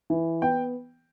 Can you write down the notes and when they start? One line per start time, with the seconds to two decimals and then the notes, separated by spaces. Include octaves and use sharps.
0.10 E3
0.42 B3 G5